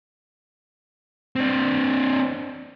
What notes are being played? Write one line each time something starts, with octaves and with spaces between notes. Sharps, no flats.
C4 D4